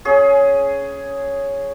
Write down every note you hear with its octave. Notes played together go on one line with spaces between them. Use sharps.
C#4 G#4